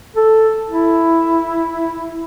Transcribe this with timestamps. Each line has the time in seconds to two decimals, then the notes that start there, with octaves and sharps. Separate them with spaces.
0.16 A4
0.70 E4